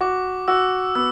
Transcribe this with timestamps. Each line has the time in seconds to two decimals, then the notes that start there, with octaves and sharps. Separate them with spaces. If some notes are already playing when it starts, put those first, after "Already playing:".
0.01 F#4 D6
0.48 F#4 E6
0.95 B3 E6